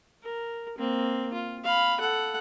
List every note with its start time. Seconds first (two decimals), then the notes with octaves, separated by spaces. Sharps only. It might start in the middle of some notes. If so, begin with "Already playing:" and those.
0.23 A#4
0.78 A#3 C4
1.33 F4
1.64 F5 B5
2.00 A4 F#5